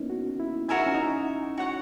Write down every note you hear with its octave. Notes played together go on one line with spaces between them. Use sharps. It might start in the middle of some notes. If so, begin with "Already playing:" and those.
Already playing: A#3 B3 C#4 D#4 E4
F#4
E4
E4 F#4 A#4 E5 G#5
D#4
C#4
D#4
F#4 C#5 F#5 C#6